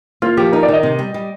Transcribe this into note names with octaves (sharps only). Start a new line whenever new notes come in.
A#3 F4
F3 G4
D#4 A#4
D5
D#3
D#5
C3
G3
G3